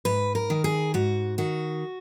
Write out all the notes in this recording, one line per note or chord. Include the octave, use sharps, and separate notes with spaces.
G#2 B4
A#4
D#3
G#4
G#2 F#4
D#3 F#4